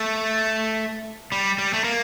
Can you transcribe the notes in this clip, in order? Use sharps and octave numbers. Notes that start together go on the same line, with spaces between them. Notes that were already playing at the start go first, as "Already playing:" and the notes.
Already playing: A3
G3
G3
A3
A#3